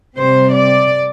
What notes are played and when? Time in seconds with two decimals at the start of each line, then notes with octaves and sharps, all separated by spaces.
0.17 C3 G3 C4 C5
0.54 D5